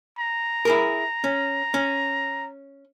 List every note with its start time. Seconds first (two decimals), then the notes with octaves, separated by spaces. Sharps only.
0.18 A#5
0.65 E4 G#4 A#4
1.24 C#4
1.74 C#4